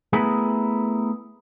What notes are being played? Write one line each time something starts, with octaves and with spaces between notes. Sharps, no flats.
A3 B3 E4 G#4 A#4